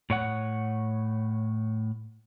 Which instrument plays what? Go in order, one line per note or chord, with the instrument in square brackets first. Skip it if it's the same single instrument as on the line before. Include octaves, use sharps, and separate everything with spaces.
[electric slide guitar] A2 C#5 F#5